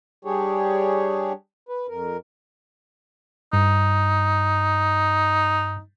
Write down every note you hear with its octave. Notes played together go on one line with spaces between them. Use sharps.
G3 D4 G4 G#4 C#5
B4
F2 A#4
G2 D#4